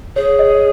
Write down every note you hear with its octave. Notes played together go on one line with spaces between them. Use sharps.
G#4 C#5
D#5